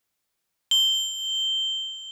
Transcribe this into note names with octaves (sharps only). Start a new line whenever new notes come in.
G7